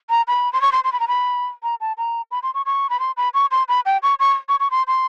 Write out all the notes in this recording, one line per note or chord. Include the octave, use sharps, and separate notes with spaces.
A#5
B5
C6
C#6
C6
C6
B5
A#5
B5
A#5
A5
A#5
B5
C6
C#6
C#6
B5
C6
B5
C#6
C6
B5
G5
C#6
C#6
C#6
C#6
C6
C6